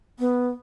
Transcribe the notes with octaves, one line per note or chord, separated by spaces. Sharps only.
B3